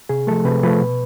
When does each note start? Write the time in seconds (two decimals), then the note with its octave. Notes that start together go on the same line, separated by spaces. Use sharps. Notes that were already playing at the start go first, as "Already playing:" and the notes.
0.09 C3 G#4
0.27 F3 A3 A4
0.45 C3 B4
0.63 F3 A3 B4
0.82 B2